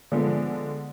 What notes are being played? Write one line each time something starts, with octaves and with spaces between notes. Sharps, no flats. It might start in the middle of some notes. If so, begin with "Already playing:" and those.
D3 F3 G#3 A3 B3